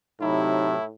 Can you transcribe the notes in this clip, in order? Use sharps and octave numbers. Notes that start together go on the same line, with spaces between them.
A2 C3 F#3 D#4 E4